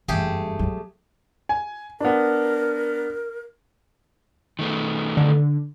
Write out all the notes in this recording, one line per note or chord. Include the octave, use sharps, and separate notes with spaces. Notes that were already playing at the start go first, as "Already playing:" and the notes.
F#1 E2 G2 A3 G4 G#4
F#3 B3
G#5
B3 D4 A#4
D#3 A3 B3
D3